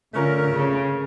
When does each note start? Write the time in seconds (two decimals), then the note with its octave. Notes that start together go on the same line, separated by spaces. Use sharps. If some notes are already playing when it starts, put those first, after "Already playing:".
0.13 D3 A3 C#4 F4 A#4
0.50 C#3